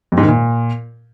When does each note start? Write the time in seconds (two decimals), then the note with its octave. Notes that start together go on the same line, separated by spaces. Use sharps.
0.12 F2
0.17 G#2
0.23 D#3
0.28 A#2